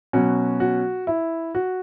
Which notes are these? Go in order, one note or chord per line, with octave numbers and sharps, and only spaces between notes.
B2 F#3 C#4 F#4
F#4
E4
F#4